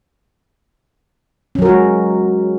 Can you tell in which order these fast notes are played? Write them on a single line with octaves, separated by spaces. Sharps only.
C#4 F#3 A#4 F#4 G#3